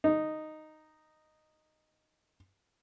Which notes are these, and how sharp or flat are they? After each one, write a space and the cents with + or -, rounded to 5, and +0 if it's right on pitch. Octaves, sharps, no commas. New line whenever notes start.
D#4 -5